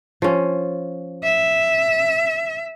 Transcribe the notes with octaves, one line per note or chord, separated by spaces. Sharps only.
F3 C#4
E5